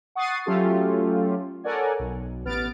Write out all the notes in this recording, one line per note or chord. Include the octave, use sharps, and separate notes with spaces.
F#5 C#6 D#6 A6 C7 D#7
F#3 A3 C#4 F4 G4 A4
A4 A#4 C#5 D5 F#5 G#5
B1
A1 B3 F6 A6 D7